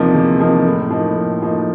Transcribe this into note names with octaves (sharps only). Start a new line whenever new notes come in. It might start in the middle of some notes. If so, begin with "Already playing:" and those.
Already playing: E2 C3 F3 A#3 D#4
E2
C3 F3 A#3 D#4
A2
F3 A#3 D#4
A2
F3 A#3 D#4